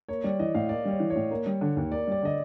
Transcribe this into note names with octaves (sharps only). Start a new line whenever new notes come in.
A#3 C#5
G3 D5
E3 D#5
A2 F5
A#3 D5
G3
C#5
E3
C#5
A2
A#3
G3
D3
D#2
A#3 D5
G3 D5
D3 D#5